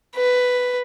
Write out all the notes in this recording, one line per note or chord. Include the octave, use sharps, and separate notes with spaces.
B4